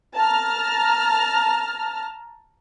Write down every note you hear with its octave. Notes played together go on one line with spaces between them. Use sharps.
A5 A#5 F6